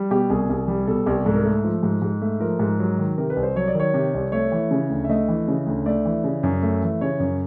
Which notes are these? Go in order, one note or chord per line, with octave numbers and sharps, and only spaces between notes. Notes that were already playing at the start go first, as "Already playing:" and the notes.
Already playing: G3
B2 G4
C2 G#4
C2
G3
B2 A4
C2 G4
G#2 A4
A#4
A3 A4
F3
G#2
G#2
A3
F3 A#4
G#2
F#3
D#3
C3 A#4
B4
C2
C5
F#3 C#5
D5
D#3
C#5
C3
C2
A3 C#5
E3
C#3
D2
E5
A3 D#5
E3
C#3
D2
A3 D5
E3
C#3
F#2
A3
E3
C#3 C#5
F#2